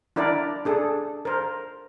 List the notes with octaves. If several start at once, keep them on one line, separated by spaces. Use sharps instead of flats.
D4 E4 A#4 D5
D4 G#4 A4
A#4 C5